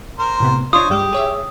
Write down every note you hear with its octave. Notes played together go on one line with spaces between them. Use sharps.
A#4 C5
A2 C3 B3
D4 F4 C5 C#5 D#5 D#6
G2 G3 G#3 G4
G#4 C#5 E5